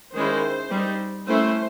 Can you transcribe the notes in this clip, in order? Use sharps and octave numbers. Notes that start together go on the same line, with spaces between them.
D#3 G#3 C#4 E4 C5
G3 C4 D#4
A3 C#4 E4 C5